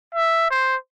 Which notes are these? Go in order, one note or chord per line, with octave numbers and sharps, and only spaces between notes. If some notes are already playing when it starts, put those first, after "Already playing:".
E5
C5